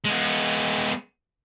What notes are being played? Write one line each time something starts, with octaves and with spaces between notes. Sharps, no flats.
G#3 B3